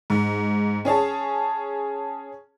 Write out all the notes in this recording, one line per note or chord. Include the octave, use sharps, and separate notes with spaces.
G#2
C#4 G#4 C#5 A5